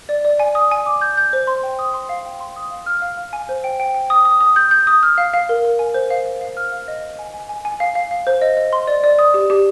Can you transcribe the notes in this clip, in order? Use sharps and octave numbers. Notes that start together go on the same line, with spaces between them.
D5
D5
G#5
D#6
G#5
D6
G6
G6
C5
C6
G5
D#6
C6
F5
G5
C6
D#6
F5
F6
F5
F5
G#5
C5
G5
G5
G5
D#6
D#6
D#6
G6
G6
D#6
F6
F5
F5
A#4
A#4
G#5
C5
F5
F5
F5
F6
F5
D#5
D#5
G#5
G#5
G#5
G#5
F5
F5
F5
C5
D#5
D#5
C6
D5
D5
D#6
G4
G4